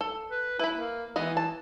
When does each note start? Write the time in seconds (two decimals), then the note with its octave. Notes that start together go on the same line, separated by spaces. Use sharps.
0.01 A4
0.30 B4
0.59 E4 B4 B5
0.74 A#3
1.16 E3 G#3 B3 D#5
1.37 A5